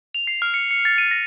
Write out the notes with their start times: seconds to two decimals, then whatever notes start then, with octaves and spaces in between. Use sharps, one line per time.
0.14 F7
0.27 C7
0.42 F6
0.54 C#7
0.71 C#7
0.85 A6
0.98 D#7
1.11 A#6